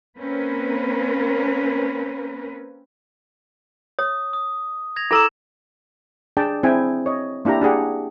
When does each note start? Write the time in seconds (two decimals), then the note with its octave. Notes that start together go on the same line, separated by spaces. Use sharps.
0.17 A#3 C4 C#4 A#4 B4
3.99 C#5 D#6
4.33 D#6
4.96 G#6 A#6 F7
5.11 E4 A4 A#5 D6 E6 E7
6.37 D4 G#4 D5 G5 A5
6.63 C4 E4 G#4 G5 G#5
7.06 C#5 D#5
7.45 A#3 D4 E4 G4 A#5
7.61 D4 G4 G#4 F#5